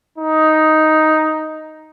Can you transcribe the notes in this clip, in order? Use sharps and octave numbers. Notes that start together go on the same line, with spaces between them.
D#4